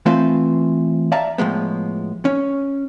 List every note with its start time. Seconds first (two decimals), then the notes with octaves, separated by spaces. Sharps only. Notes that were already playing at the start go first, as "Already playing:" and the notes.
0.06 E3 A3 C4 F4 B4 C5
1.12 D5 E5 F5 A5 A#5
1.38 A2 F3 G#3 B3
2.25 C#4